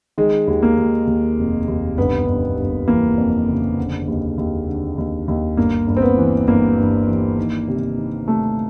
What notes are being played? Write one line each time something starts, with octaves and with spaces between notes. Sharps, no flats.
D#3 G#3
D#2
A#3
D#2
D#2
F1
D#2
G1 B3
G1
G1
E3 A#3
F2
C#3
D3
D#2
D#2
D3
D#2
D#2
G1 A#3
G1
C4
B3
E3
G1 A#3
G2
E3
D#3
C3
D#3
C3 A3